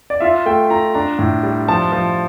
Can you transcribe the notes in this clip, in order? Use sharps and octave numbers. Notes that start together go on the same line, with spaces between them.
D5
F4 E5
A3 G5
F4 A#5
D4 A#5
A2
G3
F3 A5
F3